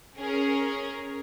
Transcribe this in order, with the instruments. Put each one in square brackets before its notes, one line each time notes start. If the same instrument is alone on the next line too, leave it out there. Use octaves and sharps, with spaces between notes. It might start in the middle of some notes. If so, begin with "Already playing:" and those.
[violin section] C#4 G#4 A#4